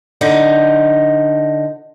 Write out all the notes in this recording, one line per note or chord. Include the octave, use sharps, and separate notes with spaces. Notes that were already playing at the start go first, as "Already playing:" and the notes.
D3 D#4 C5